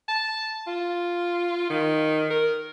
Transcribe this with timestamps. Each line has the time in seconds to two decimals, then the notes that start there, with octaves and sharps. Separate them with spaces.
0.08 A5
0.67 F4
1.70 D#3
2.30 A#4